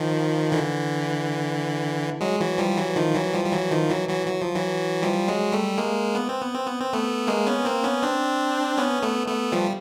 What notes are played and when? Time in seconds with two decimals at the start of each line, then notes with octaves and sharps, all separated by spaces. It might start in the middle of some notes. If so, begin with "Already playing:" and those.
Already playing: D#3 F3
0.52 D3 E3
2.21 F#3 G#3
2.40 E3 F#3
2.58 F3 G3
2.77 E3 F#3
2.96 D#3 F3
3.15 E3 F#3
3.34 F3 G3
3.45 G3
3.52 E3 F#3
3.71 D#3 F3
3.89 E3 F#3
4.09 E3 F#3
4.27 F#3
4.42 F3
4.55 E3 F#3
5.03 F3 G3
5.28 F#3 G#3
5.52 G3 A3
5.78 G#3 A#3
6.15 B3
6.29 C4
6.42 B3
6.55 C4
6.67 B3
6.81 C4
6.93 A3 B3
7.27 G#3 A#3
7.47 B3 C#4
7.65 A#3 C4
7.84 B3 C#4
8.03 C4 D4
8.77 B3 C#4
9.02 A3 B3
9.27 A3 B3
9.52 F3 G3